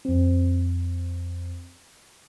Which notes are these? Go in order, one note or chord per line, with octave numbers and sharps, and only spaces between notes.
F2 C4